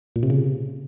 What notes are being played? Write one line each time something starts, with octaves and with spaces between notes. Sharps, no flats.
A#2
C3
C#3